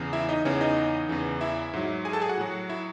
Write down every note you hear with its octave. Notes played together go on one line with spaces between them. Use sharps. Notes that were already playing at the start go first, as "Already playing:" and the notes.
Already playing: E2 C#3 E3
E4 E5
D#4 D#5
E2 C#3 E3 C#4 C#5
D#4 D#5
E2 C#3 E3
E4 E5
G#2 F#3
G#4 G#5
A4 A5
G#4 G#5
F#4 F#5
A2 F#3
E4 E5